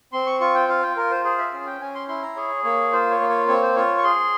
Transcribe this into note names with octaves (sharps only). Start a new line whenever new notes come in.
C4 C6
C#6
F4 C#6
G5
F4 F5
G5
F4 A#4
C5
G#4 C5
E5
C#4
G5
C#4 G#5
C6
E4 C6
A#5
G#4 C#5
A#3 C#5
F4 C5
C#5
A#3
C#5
C4 C#5
C5
F4 C#5
C#6
G#4 C6